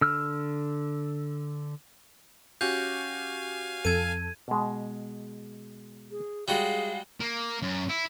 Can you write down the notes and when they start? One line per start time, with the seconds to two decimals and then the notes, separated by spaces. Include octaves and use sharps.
0.01 D3 E6 F6
2.61 C#4 F#4 G4 F5 G#5 G6
3.85 F2 A4 G#6 D#7
4.48 B2 G#3
6.11 G#4
6.48 G3 G#3 F#4 G#4 F5
7.20 A#3
7.62 F#2
7.89 E4